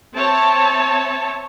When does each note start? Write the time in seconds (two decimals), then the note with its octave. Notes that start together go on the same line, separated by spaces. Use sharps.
0.15 C4 C#5 E5 A5